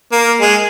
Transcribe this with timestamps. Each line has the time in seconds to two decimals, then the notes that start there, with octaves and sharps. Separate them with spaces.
0.12 A#3
0.41 G#3